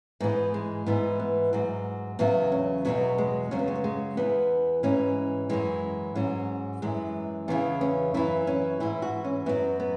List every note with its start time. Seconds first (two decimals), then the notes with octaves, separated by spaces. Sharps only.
0.20 G#2 E3 B3
0.54 G#3
0.86 G#2 E3 B3
1.20 B3
1.53 G#2 F#3
2.19 E2 C#3 F#3 B3
2.52 C#4
2.85 E2 B2 F#3 B3
3.18 G#3
3.51 F#2 C#3 F#3 C#4
3.59 B3
3.68 G#3
3.75 B3
3.84 G#3
4.17 E2 E3 B3
4.83 G#2 E3 C#4
5.49 F#2 E3 G#3
6.15 G#2 F#3 C#4
6.82 F#2 E3 G#3
7.48 E2 C#3 E3 B3
7.81 C#4
8.14 F#2 E3 E4
8.47 C#4
8.80 G#2 E3 E4
9.02 F#4
9.24 C#4
9.46 F#2 F#3 B3
9.80 B3